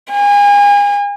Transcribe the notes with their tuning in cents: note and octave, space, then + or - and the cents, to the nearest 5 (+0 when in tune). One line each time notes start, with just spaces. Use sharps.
G#5 -35